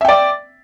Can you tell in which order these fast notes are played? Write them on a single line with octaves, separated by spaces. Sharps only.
E5 G5 D5